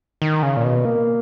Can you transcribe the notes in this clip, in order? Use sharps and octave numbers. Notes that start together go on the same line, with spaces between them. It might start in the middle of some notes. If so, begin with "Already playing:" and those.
D#3
C#3
A#2
B2
A#3